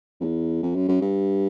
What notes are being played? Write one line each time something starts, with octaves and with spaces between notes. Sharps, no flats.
F2
E2
F2
F#2
F#2
G2